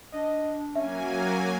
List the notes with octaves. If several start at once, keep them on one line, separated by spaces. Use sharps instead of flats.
D4 D#5
F#3 A#3 C#4 E5 G#5
A#4